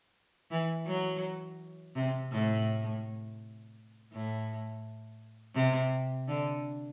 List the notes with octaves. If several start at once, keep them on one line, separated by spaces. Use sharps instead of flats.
E3
F#3
C3
A2
A2
C3
D3